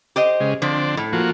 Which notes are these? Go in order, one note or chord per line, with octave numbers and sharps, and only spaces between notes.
G4 C5 D#5
C#3 G#3
D3 F3 C4 D4
A2
F3 A#3 F#4